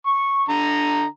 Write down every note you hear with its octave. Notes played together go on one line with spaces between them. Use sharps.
C#6
D3 A#5